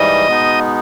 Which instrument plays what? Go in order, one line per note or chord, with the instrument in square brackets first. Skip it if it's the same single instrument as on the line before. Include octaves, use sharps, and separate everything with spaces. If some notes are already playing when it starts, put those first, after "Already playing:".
Already playing: [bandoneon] G#2 E3 G3 [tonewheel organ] D#5
[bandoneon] B2 G#3 B3 D#4